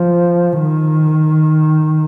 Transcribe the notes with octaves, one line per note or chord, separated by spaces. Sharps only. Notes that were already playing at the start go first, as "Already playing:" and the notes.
Already playing: F3
D#3